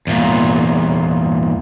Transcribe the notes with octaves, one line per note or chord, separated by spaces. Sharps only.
E2 A#2